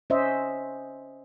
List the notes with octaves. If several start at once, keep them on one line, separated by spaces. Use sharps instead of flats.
C#4 C5 D#5 E5